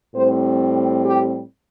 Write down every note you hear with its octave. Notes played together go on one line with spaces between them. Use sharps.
A2 G3 C4 C5
G4